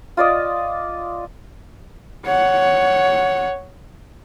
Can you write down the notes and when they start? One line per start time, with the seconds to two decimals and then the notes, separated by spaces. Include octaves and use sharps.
0.17 F4 D5 D#5
2.25 C#5 F#5